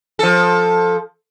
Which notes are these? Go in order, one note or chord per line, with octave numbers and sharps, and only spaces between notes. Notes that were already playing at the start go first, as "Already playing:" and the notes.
F3 A4